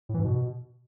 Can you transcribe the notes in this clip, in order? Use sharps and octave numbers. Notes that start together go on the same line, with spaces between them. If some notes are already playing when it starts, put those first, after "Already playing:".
A2
E3
G#2
B2